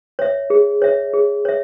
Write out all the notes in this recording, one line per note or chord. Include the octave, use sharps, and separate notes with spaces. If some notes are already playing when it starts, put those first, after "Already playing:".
C#5 E5
G#4
C#5 E5
G#4
C#5 E5